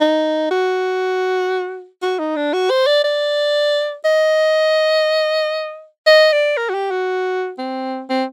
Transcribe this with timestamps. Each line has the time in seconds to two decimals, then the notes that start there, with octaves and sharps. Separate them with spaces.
0.01 D#4
0.51 F#4
2.02 F#4
2.19 D#4
2.36 D4
2.53 F#4
2.70 C5
2.87 D5
3.04 D5
4.05 D#5
6.07 D#5
6.33 D5
6.57 A#4
6.70 F#4
6.74 G4
6.91 F#4
7.58 C4
8.10 C4